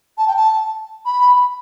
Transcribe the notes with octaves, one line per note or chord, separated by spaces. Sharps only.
A5
G5
A5
B5